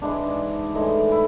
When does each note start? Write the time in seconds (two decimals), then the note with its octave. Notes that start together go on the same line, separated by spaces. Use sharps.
0.02 G#2 E3 G#3 D4
0.75 A2 E3 G#3 D#4
1.12 E4